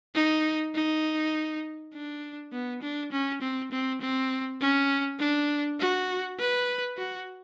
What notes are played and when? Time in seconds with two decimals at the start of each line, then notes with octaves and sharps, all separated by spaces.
0.15 D#4
0.75 D#4
1.93 D4
2.52 B3
2.82 D4
3.11 C#4
3.41 C4
3.71 C4
4.01 C4
4.61 C#4
5.19 D4
5.79 F#4
6.39 B4
6.97 F#4